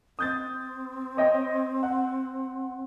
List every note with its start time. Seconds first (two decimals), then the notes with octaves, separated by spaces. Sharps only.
0.19 C4 D#6 G6 A6
1.17 C#5 D#5 G5
1.83 F#5